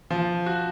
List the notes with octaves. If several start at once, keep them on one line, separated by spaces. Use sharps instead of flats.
F3
F#4